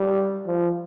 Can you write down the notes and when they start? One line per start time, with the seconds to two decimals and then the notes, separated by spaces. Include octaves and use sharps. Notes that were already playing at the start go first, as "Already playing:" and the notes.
Already playing: G3
0.46 F3